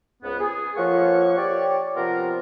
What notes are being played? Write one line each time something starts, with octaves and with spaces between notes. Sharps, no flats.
C#2 G#2 B3
G#4
F2 F3 A#3 C#5 F#5 C#6
G4 C#5 D5
C3 F3 B3 C4 F4 A#4